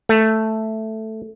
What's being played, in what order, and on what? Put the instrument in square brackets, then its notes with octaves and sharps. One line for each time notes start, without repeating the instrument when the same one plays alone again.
[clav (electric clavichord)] A3